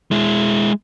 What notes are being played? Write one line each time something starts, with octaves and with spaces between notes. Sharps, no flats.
G#3 E4